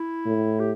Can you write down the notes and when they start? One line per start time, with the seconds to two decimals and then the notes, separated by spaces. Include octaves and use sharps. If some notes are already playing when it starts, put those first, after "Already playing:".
Already playing: E4
0.26 A2
0.60 G4